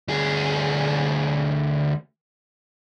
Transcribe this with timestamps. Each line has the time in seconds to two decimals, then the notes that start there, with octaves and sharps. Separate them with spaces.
0.08 D2 G#4